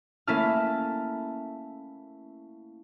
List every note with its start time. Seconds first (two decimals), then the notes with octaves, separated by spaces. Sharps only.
0.27 A3 A#3 C#4 E4 A5 F6